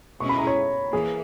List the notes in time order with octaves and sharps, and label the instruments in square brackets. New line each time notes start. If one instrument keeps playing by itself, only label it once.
[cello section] B2 G#3 C#4 E4 G#4 [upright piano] C#6
[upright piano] B5
A#5
C#5
[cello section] E3 A#3 [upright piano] G#4